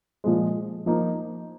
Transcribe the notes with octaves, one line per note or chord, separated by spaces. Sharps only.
A#2 F3 G#3
F3 A#3 D#4